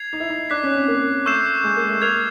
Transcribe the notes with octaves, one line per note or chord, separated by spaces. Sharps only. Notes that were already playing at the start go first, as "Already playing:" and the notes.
Already playing: G#6 C7 F7
D#4
E4
D#4
D4 D6 F#6 B6
C#4
C4
A#3
A3 C#6 E6 G6 C7 E7
G#3
A#3
A3
A#3 F6 G#6 C7 F7